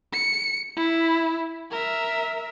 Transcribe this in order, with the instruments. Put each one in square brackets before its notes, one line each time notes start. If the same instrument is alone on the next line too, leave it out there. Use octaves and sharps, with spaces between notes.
[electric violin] C#7
E4
A#4 E5